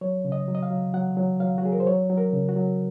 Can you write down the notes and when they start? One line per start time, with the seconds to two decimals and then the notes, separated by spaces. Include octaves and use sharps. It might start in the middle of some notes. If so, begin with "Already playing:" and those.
0.01 F#3 C#5
0.25 C#3
0.32 D#5
0.48 F#3
0.55 D#5
0.63 F5
0.71 F#3
0.94 F#3 F#5
1.17 F#3
1.40 F#3 F5
1.58 F#4
1.63 F#3 G#4
1.72 A#4
1.80 C5
1.86 F#3 C#5
2.10 F#3
2.18 A#4
2.33 C#3
2.49 F#4
2.56 F#3